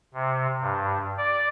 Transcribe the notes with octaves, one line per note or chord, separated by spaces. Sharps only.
C3
G2
D5